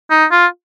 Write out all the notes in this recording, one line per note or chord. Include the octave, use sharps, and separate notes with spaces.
D#4
F4